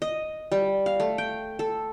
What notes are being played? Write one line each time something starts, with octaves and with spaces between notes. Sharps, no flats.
D#5
G3
F5
A3
G5
A4